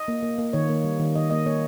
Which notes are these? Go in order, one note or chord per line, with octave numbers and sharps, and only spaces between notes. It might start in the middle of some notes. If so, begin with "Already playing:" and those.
Already playing: D#5
A#3
A#3
A#3
D#3 C#5
A#3
G3
D#3
D#3 D#5
A#3 D#5
A#3 C#5